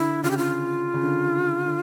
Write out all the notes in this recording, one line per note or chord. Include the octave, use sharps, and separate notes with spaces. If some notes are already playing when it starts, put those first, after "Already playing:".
Already playing: D3 E4
C#3 F4
G4
F4
C#3
D3
D3